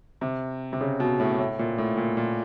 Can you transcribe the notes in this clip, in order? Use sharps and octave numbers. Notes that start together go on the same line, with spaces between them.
C3
C3
C#3
B2
A2
A2
A#2
A2
A#2
A#2